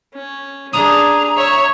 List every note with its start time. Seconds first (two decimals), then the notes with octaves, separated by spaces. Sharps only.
0.14 C#4
0.73 D4 G#4 A#5 D#6
1.37 C#5 E5